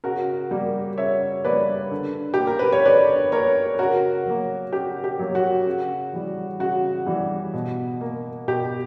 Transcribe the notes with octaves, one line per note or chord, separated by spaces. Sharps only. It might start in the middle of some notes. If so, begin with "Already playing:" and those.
C#3 F#4 A#4
G3 A#3
C#3 C#5 E5
G3 A#3 B4 D5
D3
A#3 G4
A#4
B4
C#5
D3 B4 D5
A#3 A#4 C#5
C#3 F#4 A#4
F#3 A#3
C#3 G4
G4
F#3 A#3
F#4
C#3
E3 G3
C#3 F#4
E3 G3
B2
A#3
B2 G4